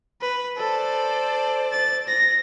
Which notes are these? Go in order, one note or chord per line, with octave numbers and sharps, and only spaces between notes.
B4
A4 C5 D5
A6
A#6